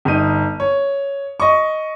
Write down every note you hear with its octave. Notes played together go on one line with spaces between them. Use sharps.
G1 D#4 D#7
C#5
D#5 C#6